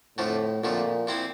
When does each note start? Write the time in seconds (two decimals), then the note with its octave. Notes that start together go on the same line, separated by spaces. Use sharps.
0.18 F2 A2 D3 F3 A3
0.63 F2 A#2 D3 F3 A3
1.07 A#2 F3 C4 E4